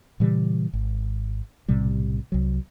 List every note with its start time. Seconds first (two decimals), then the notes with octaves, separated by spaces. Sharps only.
0.20 A#2 C#3 E3 G3
0.73 G#1
1.68 B1 A2 C3 G3
2.32 C2 F#3